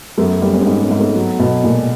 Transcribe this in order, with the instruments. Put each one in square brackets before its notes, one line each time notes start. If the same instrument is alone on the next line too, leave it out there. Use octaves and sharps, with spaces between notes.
[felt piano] F#2 [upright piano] A3 B3
[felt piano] G3 [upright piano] B3 C#4
[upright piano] B3 C#4
C4
[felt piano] G#2 [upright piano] B3 C#4
[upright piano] B3 C#4
[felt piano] G#2
[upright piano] A3 B3
[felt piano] F#3
B2
[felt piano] A#2 [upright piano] G#3 A#3